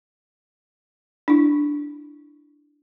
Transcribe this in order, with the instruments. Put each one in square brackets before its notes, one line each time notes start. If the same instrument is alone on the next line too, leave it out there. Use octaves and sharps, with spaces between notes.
[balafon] D4 E4